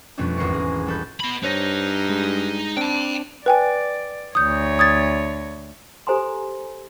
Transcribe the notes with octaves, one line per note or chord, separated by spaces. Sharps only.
F2 B2 G3 A3 C#4 D4
G#1 E2 A#4 C5 C#6
G#4
E1 G3 A4 B4 G6
B2 B5
G2 D#4 C5 C#5 A#6
G#3
C4 D4 G5 A5
B4 D5 G5 G#5
D2 C#5 D#6 G6
D#6 G#6 A6
G4 A4 C5 G#5 A#5 C6